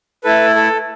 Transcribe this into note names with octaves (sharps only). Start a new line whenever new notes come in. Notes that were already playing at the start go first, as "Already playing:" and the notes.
A3 E4 A4 B4
A4